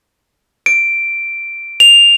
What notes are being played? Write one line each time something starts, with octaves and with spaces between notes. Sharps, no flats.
D7
F7